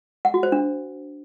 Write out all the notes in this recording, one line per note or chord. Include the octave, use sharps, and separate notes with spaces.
F#5
F#4
C5
D4